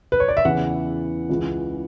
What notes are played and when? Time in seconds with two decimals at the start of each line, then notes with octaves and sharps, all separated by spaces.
0.12 B4
0.20 C#5
0.28 D5
0.37 E5
0.45 E2 C#3 E3 F#5
1.29 C#2 C#3 E3